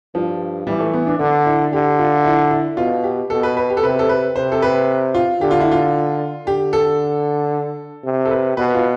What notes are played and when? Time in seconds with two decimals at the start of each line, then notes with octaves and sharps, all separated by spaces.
0.15 G2 F3
0.67 E3 G3
0.80 A3
0.93 B3
1.07 D4
1.19 D3 D4
1.46 E4
1.72 D3 G4
1.99 F4
2.25 E4
2.51 E4
2.77 B2 F4
3.03 G4
3.30 B2 A4
3.43 B4
3.57 B4
3.70 G4
3.77 A4
3.83 C3 B4
3.99 A4
4.09 B4
4.36 C3 C5
4.52 A4
4.62 B4
5.14 F4
5.41 D3 G4
5.51 F4
5.60 E4
5.71 F4
6.46 D3 G4
6.73 A4
8.05 C3
8.25 A4
8.31 B4
8.57 B2 B4
8.75 F4